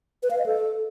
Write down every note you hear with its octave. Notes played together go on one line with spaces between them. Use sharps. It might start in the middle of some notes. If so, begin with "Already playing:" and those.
B4
F5
D#5
A4